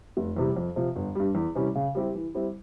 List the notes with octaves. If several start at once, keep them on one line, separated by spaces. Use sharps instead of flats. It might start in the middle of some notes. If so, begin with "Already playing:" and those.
F1
E2 C3 G3
F2
C3 F3
G1
G2 G3
E2
C3 E3 G3 C#4
C#3
G3 C4 E4 G4
E3
G3 C4 E4